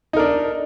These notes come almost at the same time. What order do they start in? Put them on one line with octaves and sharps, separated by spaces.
D#4 A#4 D4